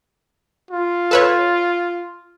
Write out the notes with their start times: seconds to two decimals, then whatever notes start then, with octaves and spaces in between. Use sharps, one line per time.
0.71 F4
1.11 A4 B4 C#5